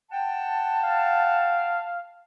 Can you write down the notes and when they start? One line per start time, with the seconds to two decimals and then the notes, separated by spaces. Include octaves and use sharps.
0.12 F#5 G5 A5
0.84 F5